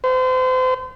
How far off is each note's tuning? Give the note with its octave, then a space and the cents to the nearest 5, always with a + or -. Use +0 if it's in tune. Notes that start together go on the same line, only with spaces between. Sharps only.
C5 -35